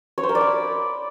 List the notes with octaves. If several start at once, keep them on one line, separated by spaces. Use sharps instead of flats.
C#5
C5
A#4
D5
B5